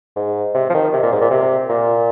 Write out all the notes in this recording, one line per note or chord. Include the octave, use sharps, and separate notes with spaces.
G#2
C3
F3
D#3
C3
A#2
G#2
A#2
C3
A#2